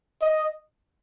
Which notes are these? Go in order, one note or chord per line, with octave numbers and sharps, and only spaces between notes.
D#5